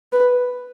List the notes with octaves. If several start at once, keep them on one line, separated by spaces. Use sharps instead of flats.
B4